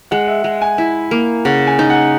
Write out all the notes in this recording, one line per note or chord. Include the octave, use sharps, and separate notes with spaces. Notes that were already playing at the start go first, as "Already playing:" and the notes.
G#3 F#5
E5
G#3 F#5
G#5
E4
A#3
C#3 F#5
G#5
D#4
F#5